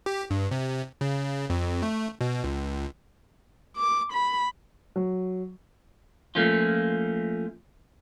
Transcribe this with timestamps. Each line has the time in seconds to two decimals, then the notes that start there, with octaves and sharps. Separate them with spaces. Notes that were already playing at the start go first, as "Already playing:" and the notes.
0.06 G4
0.30 G2
0.51 C3
1.01 C#3
1.50 F2
1.83 A3
2.21 B2
2.44 C#2
3.76 D6
4.12 B5
4.96 F#3
6.35 F3 A3 A#3 C#4 F4